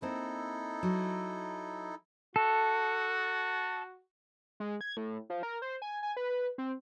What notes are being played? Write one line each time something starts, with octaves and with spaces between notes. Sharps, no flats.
A#3 C4 D#4 E4 A4
F#3
F#4 A4
G#3
G#6
A2
F3
A#4
C5
G#5
G#5
B4
C4